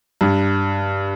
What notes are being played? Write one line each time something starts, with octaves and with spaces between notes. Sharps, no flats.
G2